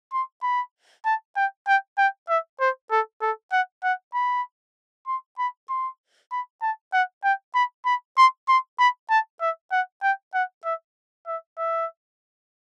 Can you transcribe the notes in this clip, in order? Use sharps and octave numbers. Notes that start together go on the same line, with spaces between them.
C6
B5
A5
G5
G5
G5
E5
C5
A4
A4
F#5
F#5
B5
C6
B5
C6
B5
A5
F#5
G5
B5
B5
C6
C6
B5
A5
E5
F#5
G5
F#5
E5
E5
E5